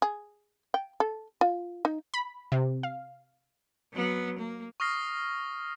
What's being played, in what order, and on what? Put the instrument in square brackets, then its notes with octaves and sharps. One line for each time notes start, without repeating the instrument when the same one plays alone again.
[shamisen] G#4
G5
A4
F4
D#4
[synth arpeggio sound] B5
C3
F5
[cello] F#3 B3
A#3
[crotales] C#6 D#6 F6 A#6 C7